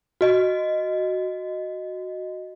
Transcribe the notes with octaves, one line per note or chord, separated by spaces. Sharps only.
F#4 D#5